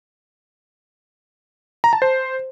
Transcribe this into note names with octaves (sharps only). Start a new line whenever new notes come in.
A#5
A5
C5